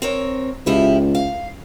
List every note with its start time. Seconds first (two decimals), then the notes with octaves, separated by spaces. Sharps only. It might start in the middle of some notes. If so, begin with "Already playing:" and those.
0.02 C4 A#4 C#5
0.66 C#2 F3 E4 G4
1.15 F5